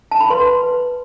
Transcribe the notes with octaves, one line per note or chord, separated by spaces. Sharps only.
A5
B5
B4 C6
B4